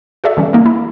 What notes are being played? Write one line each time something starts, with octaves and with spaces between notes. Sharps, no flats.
F#4 G#4 A4 D5 E5
D3 E3 G3 C#4
A3 A#3 D#4
E4